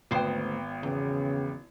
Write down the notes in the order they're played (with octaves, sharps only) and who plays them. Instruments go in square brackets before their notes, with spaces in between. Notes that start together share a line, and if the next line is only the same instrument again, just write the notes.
[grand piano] G#1 B3 G5 [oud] D2 C5
[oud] E2 [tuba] C#3